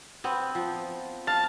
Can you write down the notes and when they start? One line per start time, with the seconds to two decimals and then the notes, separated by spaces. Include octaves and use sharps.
0.24 B3 C4
0.55 F3
1.27 F5 A5